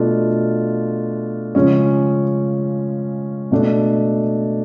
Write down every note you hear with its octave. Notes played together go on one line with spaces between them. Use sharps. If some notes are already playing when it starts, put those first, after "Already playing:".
Already playing: B2 A3 D4 F4
C#3 F3 G#3 C#4
B2 A3 D4